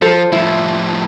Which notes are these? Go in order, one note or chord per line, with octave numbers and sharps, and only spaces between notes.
F3 A4 C5
A2 F3 E4